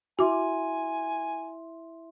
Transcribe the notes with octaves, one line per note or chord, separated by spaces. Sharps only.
E4 F#4 E5 G#5 C6 D6